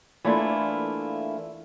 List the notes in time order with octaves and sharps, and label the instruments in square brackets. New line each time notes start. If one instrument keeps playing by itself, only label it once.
[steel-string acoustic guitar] E3 A3 A#3 D4 E4 F4